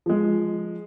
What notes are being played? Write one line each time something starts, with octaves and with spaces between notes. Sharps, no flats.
F3 G#3